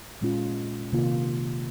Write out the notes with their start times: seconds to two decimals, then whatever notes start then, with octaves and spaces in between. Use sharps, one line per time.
0.21 A#2 G#3 C#4 F4
0.93 C3 D#3 A#3 F4